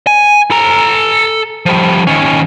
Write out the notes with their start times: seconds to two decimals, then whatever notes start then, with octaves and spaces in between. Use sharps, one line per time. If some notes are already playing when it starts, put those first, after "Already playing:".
0.07 G#5
0.51 A4 A#5
1.66 F3 G3
2.07 D#3 C#4